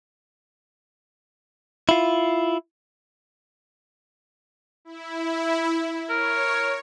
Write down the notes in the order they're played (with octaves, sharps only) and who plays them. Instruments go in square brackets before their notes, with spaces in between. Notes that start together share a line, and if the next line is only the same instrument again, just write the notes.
[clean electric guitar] E4 F4
[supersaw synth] E4
[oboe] A#4 [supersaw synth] C#5